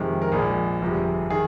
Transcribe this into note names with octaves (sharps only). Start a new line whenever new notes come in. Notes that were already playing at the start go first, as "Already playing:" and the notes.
Already playing: F2 C3 D#3 G#3
A#4
A#1 A#2 G#3 G#4
G1 F2 C3 F3
D#3 G#4